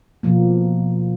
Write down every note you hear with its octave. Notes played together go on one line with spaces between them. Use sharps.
B2 F3 A#3